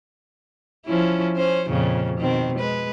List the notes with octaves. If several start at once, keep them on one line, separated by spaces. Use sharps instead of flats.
F3 C#4 E4
C#4 C5
F2 A#2 C#3
B2 D#3 C4
G#3 B4